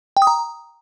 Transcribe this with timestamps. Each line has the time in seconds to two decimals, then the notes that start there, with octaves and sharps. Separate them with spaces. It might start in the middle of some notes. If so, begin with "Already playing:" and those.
0.17 G5
0.22 D#6
0.27 A#5